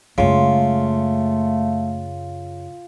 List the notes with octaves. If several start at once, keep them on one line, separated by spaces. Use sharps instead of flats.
F#2 C#3 G#3 A3 F4